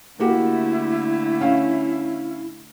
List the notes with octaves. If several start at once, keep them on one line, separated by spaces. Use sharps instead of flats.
D3 A3 A#3 E4 F#4 G4
C#4 F5